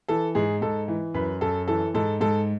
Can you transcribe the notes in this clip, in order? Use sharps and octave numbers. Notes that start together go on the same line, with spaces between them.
E3 A4
G#2 G#4
G#2 A4
E3
F#2 B4
F#2 A4
E3 A4
G#2 A4
G#2 A4